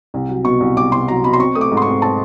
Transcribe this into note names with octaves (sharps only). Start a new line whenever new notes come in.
C2
F#3
B2 C#6
C2
C2 D6
C2 C6
F#3 A#5
B2 B5
C6
C4 C#6
A3 D#6
D6
G#2
C6
C4 C#6
C4 A5